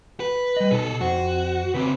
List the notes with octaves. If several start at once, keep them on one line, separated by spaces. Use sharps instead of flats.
B4
G3 D#5
B2 D#4 G#4 A4
F2 F#4 C5
C#3 C4 B4